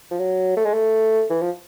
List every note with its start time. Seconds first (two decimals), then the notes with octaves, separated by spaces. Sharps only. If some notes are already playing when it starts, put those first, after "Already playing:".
0.11 F3
0.19 F#3
0.57 A3
0.65 G#3
0.73 A3
1.30 E3
1.41 F3